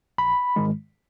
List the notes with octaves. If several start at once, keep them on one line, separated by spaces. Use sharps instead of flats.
A#1 B5
G#2 D#3 G#3